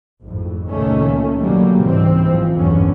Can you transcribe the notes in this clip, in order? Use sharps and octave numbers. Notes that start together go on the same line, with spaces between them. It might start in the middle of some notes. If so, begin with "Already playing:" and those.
G#1 F2 A2
C#2 A#2 D#3 A3 A#3 C#4
B2 D3 F#3 G3 A#3
C#2 G#2 E3 C4
A1 E3 F3
B1 E2 G2 D3 B3 C#4